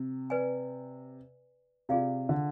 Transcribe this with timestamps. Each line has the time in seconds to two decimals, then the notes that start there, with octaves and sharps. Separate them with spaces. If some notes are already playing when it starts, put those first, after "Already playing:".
Already playing: C3
0.30 B4 D5 G#5
1.89 C3 F4 G#4 D5 F5
2.29 D3